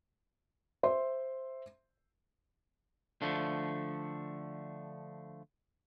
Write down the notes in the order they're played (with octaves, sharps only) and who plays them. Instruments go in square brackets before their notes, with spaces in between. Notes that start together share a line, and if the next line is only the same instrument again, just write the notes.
[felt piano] C5 E5 C6
[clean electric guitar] D3 F3 A3